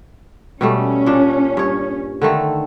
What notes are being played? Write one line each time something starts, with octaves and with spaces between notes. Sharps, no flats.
B2 G3 A3 C#4
A#2 D4
G2 C#5
D3 D#3 A3